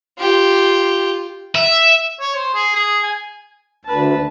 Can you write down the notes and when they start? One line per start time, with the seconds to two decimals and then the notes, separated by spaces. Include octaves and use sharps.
0.18 F4 G4
1.55 E5
2.20 C#5
2.35 C5
2.54 G#4
2.75 G#4
3.03 G#5
3.85 D2 B4 A5